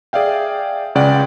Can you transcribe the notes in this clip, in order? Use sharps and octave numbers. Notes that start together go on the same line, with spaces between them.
G#4 D5 E5 F5 G5
C#2 C#3 D5 F#5 G5